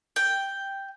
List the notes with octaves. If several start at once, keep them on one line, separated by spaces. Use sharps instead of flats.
G5